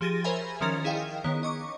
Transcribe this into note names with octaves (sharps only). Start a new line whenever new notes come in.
F3 G4 G#4 A6 A#6 D#7
A#4 C5 C#5 E5 G#5 B5
D#3 F3 C#4 A#4 A6
E4 G#4 D#5 F5 G5
D#3 B3 C#5
D#5 C#6 D6